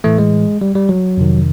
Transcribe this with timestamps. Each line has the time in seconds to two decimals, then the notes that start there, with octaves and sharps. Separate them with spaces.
0.04 A2 E3 A3
0.18 G#3
0.61 G3
0.75 G3
0.89 F#3
1.17 F2 C3 D#3